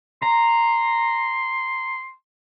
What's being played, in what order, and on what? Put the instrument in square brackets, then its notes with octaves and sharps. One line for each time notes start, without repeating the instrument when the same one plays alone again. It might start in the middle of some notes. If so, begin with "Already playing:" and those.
[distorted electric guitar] A#5 [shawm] C6